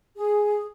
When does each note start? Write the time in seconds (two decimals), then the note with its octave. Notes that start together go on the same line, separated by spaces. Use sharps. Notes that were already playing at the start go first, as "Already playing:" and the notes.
0.16 G#4